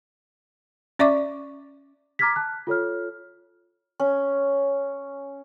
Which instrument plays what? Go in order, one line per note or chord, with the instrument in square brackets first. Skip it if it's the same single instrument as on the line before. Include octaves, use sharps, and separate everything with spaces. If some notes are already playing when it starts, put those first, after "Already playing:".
[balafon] C#4 D5 E5 C#6 D6
[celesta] A#5 D6 F6 G#6 A#6 B6
A5 F#6
F4 A4 C#5 F6
[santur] C#4